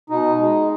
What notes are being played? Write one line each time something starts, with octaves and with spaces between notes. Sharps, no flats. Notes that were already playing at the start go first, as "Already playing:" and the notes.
B2 D#4
G#3